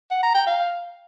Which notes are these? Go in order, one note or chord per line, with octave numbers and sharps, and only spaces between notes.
F#5
A#5
G5
F5